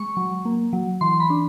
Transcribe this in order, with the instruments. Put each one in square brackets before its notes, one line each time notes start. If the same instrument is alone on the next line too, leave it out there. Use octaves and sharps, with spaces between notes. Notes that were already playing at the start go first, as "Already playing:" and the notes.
Already playing: [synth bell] G#3 C#6
F#3
A#3
F#3
E3 C6
B5
D4